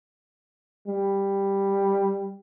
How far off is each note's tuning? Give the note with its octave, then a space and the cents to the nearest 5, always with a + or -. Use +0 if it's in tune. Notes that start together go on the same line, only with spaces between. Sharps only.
G3 +10